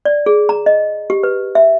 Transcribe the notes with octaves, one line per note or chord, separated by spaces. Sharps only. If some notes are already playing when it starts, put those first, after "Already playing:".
D5
G#4
A#5
D#5
G4
B4
E5